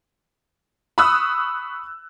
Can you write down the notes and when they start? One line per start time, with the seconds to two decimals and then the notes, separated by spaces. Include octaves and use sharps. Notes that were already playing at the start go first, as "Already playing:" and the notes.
0.98 B5 C#6 D#6 E6 F#6